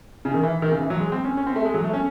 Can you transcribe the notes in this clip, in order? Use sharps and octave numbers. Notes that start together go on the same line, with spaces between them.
C#3
D#3
E3
D#3
C#3
E3
F#3
G#3
C4
C#4
C#4
C4
A3
G#3
F#3
A3
C#4